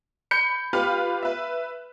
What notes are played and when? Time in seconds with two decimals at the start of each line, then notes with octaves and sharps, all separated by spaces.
0.31 B5 G6 C#7
0.73 F4 G4 B4 F5 B5 F6
1.23 B4 E5